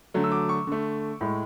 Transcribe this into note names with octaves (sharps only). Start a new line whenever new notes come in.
D3 F#3 A3
E6
D6
C#6
D3 A3
A2 G#3